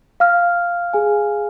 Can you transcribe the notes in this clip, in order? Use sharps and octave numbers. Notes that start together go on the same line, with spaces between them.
F5 F6
G#4 G#5